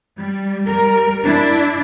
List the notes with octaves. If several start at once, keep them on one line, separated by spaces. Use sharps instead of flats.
G3
G3 A#4
D4 E4